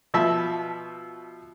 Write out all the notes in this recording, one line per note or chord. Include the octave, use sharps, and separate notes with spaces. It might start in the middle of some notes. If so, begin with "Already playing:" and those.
B2 F3 E5 A5